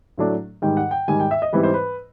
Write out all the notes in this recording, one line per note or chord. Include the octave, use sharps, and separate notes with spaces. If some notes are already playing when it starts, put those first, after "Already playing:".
A2 F#3 A3 D4
G#2 D#3 G3 G5
F#5
G5
G#2 D#3 G3 G#5
G5
E5
D#5
G#2 E3 G3 C4 B4
C5
B4